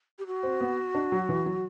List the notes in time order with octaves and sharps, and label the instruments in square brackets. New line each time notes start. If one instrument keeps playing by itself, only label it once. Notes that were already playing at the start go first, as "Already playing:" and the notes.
[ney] G4
F#4
[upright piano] C4
B3
D4
F#3
E3
F#3